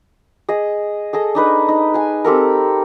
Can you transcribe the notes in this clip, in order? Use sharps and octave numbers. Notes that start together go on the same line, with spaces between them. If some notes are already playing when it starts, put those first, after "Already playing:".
G#4 D#5
G#4 A4 D#5
D4 D#4 B4
D#4
G#4 G#5
C4 G4 A4 A#4